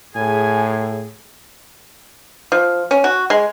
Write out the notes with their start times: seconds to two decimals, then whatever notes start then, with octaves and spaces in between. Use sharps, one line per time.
0.16 A2 G#4 G#5
2.52 F3
2.91 C#4
3.04 F#4
3.30 G#3